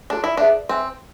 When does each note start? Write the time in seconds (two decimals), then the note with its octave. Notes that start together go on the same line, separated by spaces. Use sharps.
0.10 D4 F4 A4 D5 A5
0.24 E4
0.37 D4 G#4 B4 E5
0.69 C4 B4 E5 G#5